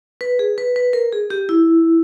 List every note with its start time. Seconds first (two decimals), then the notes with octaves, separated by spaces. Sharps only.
0.21 B4
0.39 G#4
0.58 B4
0.76 B4
0.93 A#4
1.12 G#4
1.30 G4
1.49 E4